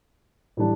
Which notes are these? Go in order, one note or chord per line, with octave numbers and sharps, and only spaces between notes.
A2 E3 G3 D4